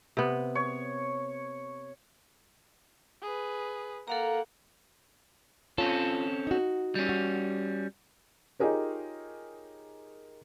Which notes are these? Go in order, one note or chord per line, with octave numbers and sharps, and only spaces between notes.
C3 B3
C#5
G#4 B4
A#3 A4 F5 F#5 A#5
C4 C#4 F4 A4 C#5
D#4 F#4
G3 C#4
F#4
D#4 F4 G4 G#4 A#4 C#5